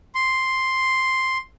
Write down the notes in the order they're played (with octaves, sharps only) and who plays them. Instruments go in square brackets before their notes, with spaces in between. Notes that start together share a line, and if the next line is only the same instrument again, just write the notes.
[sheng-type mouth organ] C6